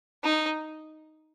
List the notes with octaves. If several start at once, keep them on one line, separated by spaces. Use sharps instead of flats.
D#4